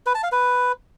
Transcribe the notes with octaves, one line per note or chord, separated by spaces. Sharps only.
B4
A5
F5
B4